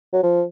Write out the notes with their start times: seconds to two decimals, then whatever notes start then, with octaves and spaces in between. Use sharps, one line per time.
0.13 F#3
0.23 F3